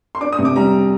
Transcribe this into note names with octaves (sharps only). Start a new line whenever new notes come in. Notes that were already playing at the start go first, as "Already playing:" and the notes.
C6
D4 D6
D#6
C3
D6
G3 A#5